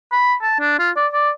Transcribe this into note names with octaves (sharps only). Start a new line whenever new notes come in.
B5
A5
D4
F4
D5
D5